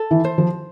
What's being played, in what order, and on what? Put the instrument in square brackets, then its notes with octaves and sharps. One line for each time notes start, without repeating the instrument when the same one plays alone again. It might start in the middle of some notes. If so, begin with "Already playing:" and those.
Already playing: [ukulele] A4
[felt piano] E3
[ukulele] C5
[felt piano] F3